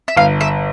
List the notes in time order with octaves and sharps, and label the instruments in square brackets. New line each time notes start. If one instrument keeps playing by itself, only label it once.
[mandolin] E5
[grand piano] G1 [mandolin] F5
[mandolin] E5